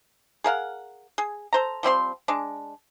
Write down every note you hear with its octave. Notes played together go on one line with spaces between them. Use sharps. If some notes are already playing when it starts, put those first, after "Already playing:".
G#4 A#4 F5 F#5
G#4
A4 C5 A#5
F3 G3 C4 C6
G#3 D4